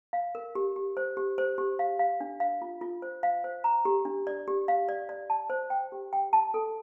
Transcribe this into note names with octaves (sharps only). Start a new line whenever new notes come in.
F5
A#4
G4
G4
C5
G4
C5
G4
F5
F5
D4
F5
F4
F4
C5
F5
C5
A#5
G4
D4
D5
G4
F5
D5
D5
A5
C5
G5
G4
G5
A5
A4